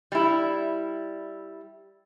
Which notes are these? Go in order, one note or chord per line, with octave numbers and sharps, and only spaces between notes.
G3 E4